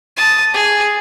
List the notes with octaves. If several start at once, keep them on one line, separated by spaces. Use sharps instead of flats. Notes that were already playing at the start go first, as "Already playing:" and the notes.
A5 D#6
G#4